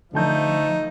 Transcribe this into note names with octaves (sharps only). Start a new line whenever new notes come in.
D3 F3 A3 D#4 A5 G6